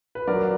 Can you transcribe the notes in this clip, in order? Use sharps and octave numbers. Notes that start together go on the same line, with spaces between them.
B4
F#3 A#4 D5